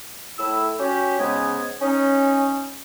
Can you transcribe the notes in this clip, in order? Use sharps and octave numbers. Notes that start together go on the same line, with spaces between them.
A2 E4 E6
C#4 F#4 G4
G#2 C#3 G#3 B3 D#5 G#5
C#4 D#4